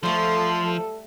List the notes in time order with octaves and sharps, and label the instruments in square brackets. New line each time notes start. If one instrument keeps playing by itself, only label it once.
[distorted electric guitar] F3 [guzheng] G3 A3 F4 [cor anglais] A4 [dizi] C6